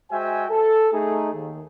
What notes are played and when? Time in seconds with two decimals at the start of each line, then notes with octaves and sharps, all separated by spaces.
0.11 G#3 F#4 C5 E5 G5 G#5
0.50 A4
0.92 A3 D#4 G#4
1.34 D#2